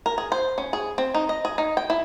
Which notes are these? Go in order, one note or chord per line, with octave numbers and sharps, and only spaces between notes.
A#4
G#4
C5
C#4
G#4
C4
D#4
D#5
G#4
D#4
G5
E4